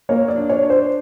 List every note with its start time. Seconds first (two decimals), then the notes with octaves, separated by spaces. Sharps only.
0.09 A#3 C#5
0.28 D5
0.36 D4
0.50 C#5
0.63 D4
0.70 C5